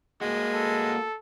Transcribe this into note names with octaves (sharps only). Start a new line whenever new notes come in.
G#3 A#3 F#4
A4